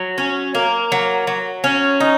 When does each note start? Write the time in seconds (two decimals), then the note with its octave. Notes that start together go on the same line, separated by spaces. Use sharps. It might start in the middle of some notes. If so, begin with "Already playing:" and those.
Already playing: F#3
0.18 C#4
0.55 A#3
0.92 F#3
1.27 F#3
1.64 C#4
2.00 D#4